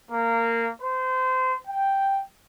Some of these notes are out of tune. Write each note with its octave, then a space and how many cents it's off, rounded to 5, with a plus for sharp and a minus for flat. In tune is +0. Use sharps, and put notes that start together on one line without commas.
A#3 -15
C5 -25
G5 +0